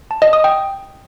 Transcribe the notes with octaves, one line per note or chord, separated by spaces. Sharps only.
A5
D#5
D#6
G5